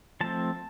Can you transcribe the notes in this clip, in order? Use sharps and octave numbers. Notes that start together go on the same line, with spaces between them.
F3 A3 C4 A5